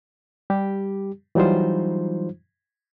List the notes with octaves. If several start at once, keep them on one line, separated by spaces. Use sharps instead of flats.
G3 G4
E3 F#3 G3 D#4 F4 C5